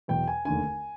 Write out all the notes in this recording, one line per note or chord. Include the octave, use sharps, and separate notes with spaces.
E2 B2 F#3 G5
G#5
F1 D#2 D3 G#5